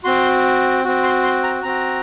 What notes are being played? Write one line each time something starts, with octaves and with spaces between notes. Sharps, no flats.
C4 F#4 C6
C4 F#4
C6
C6
A#5
C4 F#4 A#5